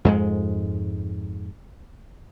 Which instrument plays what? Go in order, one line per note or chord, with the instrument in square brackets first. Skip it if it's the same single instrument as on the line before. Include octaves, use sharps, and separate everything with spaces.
[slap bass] F2 G#2 G#3